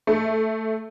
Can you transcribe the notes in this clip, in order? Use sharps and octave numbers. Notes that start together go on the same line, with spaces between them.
A3